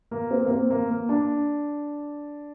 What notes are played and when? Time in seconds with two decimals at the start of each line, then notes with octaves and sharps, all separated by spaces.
0.11 A#3
0.31 C4
0.45 A#3
0.51 C4
0.70 A#3
0.90 A#3
1.09 D4